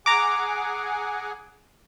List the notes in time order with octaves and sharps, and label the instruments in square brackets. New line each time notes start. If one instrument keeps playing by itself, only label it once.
[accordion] G#4 F#5 G#5 [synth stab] A#5 D6